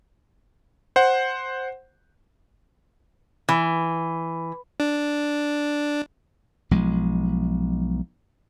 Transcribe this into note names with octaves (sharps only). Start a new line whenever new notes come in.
C5 F#5
E3
D4
B1 F3 G#3